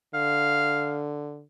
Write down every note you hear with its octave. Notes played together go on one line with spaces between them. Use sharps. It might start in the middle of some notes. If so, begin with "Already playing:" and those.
D3 F5